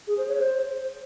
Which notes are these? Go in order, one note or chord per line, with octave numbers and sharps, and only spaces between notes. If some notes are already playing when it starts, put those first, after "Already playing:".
G#4
C5
C#5
C5